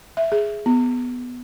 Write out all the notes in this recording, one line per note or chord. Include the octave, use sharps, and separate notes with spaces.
E5
G#4
B3